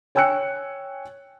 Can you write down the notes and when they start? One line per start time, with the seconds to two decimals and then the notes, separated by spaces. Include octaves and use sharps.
0.15 C#5 G5 G#5 E6 F#6 C#7